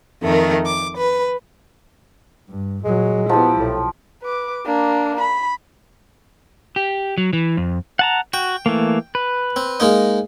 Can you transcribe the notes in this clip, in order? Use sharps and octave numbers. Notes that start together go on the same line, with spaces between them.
F2 D#3 A3 A#4
D6
B4
G2
A#2 F#3 G#3
F3 B3 E4 G4
B1 A2
B4 D6
A#3 D4
B5
G4
F#3
E3
F2
F#5 A5 A#5
F#4 G5
E3 A3 A#3
B4
C4
G#3 A#3 D#4